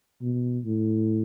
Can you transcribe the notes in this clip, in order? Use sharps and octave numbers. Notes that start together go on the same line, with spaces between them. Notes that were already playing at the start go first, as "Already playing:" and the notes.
B2
A2